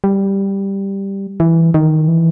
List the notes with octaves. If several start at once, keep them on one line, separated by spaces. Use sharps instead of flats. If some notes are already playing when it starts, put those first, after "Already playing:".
G3
E3
D#3
E3